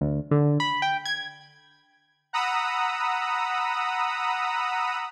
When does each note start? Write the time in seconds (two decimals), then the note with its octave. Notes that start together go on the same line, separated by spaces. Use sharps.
0.01 D2
0.31 D3
0.60 B5
0.82 G5
1.05 G#6
2.33 F#5 A#5 B5 D#6 E6